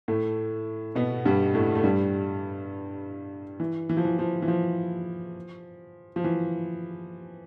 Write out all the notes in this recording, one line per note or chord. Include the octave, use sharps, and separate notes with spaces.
A2 A3
B2 B3
G2 G3
A2 A3
A3
G2 G3
E3
E3
F3
E3
F3
E3
F3
F3
E3